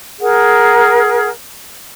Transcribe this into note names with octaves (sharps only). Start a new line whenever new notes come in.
G#4 A#4 F#5